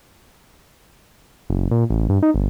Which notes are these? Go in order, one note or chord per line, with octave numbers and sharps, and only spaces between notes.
F#1
A#2
A1
G2
D#4
G1